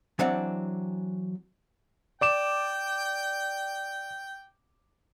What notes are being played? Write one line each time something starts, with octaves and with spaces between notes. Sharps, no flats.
E3 F#3 C4 D4 F#5
D5 G5 D6 E7